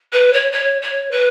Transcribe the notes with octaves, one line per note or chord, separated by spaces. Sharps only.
B4
C#5
C#5
C#5
B4